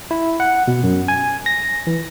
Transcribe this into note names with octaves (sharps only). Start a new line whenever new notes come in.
E4
F#5
B2
F#2
G#5
A#6
E3